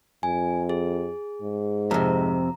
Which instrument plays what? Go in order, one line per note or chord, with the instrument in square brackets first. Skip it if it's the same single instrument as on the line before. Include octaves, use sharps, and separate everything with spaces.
[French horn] F2 [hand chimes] G#5
[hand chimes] G#4
[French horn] G#2
[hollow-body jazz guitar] F2 C3 [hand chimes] A#5